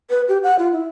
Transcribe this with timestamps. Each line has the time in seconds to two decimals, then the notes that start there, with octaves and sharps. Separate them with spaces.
0.10 B4
0.28 G4
0.43 F#5
0.59 F4
0.72 E4